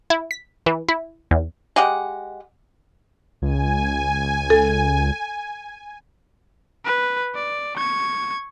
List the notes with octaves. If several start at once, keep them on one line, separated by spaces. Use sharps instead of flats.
E4
B6
E3
E4
E2
G#3 G4 F#5
C#2 G#5
A4
B4
D5
C#6 G#6